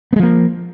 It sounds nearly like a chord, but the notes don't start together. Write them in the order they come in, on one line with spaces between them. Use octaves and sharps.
B3 G#3 F3 A#3